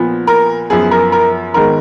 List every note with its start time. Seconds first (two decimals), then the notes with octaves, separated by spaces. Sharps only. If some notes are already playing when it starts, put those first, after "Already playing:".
Already playing: A#2 F3 B3
0.27 A#4
0.70 F#2 F3 B3 G#4
0.91 A#4
1.12 A#4
1.54 G#2 D#3 G#3 B3 A#4